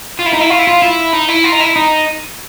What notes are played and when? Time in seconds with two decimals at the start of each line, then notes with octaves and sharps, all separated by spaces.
0.19 F4
0.26 E4
0.33 D#4
0.41 E4
0.50 F4
0.59 E4
0.67 F4
0.82 E4
1.13 D#4
1.29 E4
1.44 F4
1.52 D#4
1.60 E4
1.76 D#4